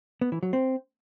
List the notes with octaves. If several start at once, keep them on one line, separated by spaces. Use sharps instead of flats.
B3
E3
F#3
C4